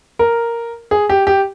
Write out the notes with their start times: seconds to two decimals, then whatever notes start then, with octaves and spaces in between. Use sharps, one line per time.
0.19 A#4
0.91 G#4
1.09 G4
1.27 G4